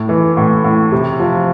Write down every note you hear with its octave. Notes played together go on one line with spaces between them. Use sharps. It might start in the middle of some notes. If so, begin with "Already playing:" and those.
Already playing: A2
E3
A2
A2
C3
F3